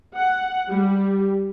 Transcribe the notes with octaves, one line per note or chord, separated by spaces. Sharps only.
F#5
G3